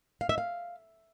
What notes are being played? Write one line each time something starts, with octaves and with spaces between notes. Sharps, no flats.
F5
E5
F5